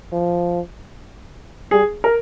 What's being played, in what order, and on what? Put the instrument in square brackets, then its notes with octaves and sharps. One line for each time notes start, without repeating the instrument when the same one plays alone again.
[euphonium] F3
[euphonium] G3 [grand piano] G#4
[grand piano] A#4